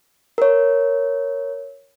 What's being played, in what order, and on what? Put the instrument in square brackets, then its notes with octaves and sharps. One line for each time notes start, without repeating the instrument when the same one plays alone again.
[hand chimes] A#4 C#5